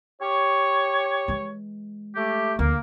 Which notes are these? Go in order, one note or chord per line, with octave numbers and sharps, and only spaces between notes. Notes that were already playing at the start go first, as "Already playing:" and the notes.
G4 C#5
E3 G#3
A3 G4
D2 A#3